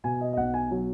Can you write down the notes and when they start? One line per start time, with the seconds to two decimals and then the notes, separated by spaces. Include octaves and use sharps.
0.04 B2 G#5
0.21 D#5
0.33 D#5
0.37 B1 F#5
0.54 G#5
0.71 F#3